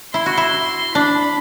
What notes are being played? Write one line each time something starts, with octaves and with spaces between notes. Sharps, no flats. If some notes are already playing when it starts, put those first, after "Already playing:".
E4 C6
F#4
E4
D4 B5